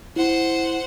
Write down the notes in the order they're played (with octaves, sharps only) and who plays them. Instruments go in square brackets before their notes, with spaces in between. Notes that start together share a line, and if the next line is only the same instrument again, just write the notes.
[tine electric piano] E4 [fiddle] C5 F#5